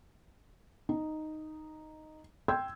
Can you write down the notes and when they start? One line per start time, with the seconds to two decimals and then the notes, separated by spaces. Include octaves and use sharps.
0.89 D#4
2.48 G5 C6 E6 G6 G#6